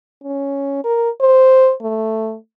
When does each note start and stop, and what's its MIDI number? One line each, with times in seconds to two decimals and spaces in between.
0.24 0.81 61
0.84 1.10 70
1.21 1.73 72
1.82 2.35 57